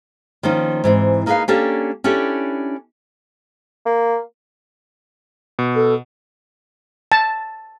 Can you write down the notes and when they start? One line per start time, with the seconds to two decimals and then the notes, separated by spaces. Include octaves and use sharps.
0.43 D#3 F3 A#3 C#4 D#4
0.84 G#2 E3 C4
1.26 A#3 D#4 G#4 A#4 B4 F5
1.48 A#3 C#4 D4 G4 A4 C#5
2.04 C#4 D4 E4 G4 A4 C#5
3.86 A#3
5.59 B2
5.75 A4
7.12 A5